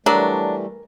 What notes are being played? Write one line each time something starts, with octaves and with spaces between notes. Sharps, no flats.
E3 F#3 G3 A3 D4 A#4